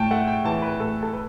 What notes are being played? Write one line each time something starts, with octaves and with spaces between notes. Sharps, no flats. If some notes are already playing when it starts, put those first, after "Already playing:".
Already playing: A2 G5 A5
A3 F#5
G5
E3 A5
B4
A2 A4
A4
B4